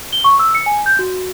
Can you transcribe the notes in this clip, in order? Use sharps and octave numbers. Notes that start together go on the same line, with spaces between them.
G7
C#6
E6
C#7
G#5
G6
F#4